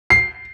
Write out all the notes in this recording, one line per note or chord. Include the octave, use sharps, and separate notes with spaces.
C7